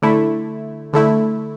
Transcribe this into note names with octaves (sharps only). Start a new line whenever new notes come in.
D3 A3 E4
D3 A3 E4